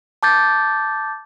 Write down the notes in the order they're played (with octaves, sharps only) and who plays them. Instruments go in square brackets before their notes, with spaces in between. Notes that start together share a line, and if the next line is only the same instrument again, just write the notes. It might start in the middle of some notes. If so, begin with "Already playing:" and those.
[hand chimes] A5 D6 G6 A6